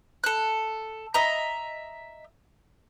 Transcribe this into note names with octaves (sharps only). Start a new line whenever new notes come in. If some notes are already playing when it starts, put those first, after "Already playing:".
A4 F#6
D#5 E5 A#5